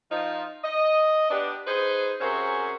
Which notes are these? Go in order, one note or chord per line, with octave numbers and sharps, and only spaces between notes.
F3 D#4 F4
D#5
B3 D4 G4
D#4 G#4 B4 C5
C3 C4 C#4 F#4 G#4 A#4